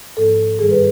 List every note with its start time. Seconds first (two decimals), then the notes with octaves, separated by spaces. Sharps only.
0.17 G#2 F3 A#3 A4
0.58 G2 D#3 G3 G#4
0.71 B4